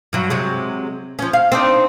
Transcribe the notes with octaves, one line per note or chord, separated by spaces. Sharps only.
G2 F#3
C3 F#3 G#3
F3 C#4
F5
C4 D4 D#4